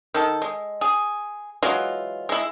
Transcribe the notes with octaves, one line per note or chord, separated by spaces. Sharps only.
D#3 A4
G#3
G#4
E3 F#3 G#3 F4
G#3 E4